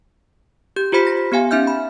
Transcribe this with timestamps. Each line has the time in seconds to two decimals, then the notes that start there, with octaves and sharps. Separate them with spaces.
0.76 G4 G6
0.92 F4 G4 C5 B5 B6
1.07 A#6
1.32 B3 G4 F5 G#5
1.51 C#4 D#4 E5 F6 G6
1.67 B5